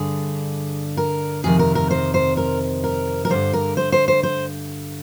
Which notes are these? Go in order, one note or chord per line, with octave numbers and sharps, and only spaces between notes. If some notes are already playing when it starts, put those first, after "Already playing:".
Already playing: G2 D3 G#4
A#4
F2 C3 D#3 G#4
A#4
A#4
C5
C5
A#4
A#4
A#4
G2 D3 C5
A#4
C5
C5
C5
C5